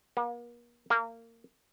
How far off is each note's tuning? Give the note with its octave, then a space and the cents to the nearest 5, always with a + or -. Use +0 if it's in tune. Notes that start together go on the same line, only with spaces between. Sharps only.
A#3 +40
A#3 -25